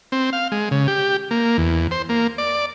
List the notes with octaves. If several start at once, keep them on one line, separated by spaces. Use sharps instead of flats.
C4
F5
G#3
C#3
G4
A#3
E2
C5
A#3
D5